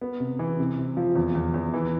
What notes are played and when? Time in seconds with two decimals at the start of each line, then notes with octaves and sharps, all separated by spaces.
0.01 B3
0.20 C3
0.39 E3
0.59 C3
0.78 C3
0.97 F3
1.16 E2
1.35 E2
1.54 E2
1.74 E3